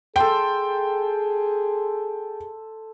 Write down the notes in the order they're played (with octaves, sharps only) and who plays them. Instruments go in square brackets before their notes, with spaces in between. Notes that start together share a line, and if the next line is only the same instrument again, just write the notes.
[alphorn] G#4 [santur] A4 C6 [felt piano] G5